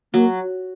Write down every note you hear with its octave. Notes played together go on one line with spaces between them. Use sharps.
F#3 A#3